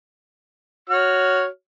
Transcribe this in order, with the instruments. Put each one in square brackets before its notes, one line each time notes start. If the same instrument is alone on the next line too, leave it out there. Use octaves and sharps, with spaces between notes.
[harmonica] F#4 C#5 F6